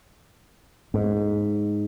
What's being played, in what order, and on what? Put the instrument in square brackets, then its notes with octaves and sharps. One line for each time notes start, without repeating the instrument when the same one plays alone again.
[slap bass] G#2